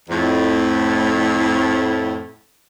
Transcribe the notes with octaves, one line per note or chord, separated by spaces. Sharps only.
F2 A2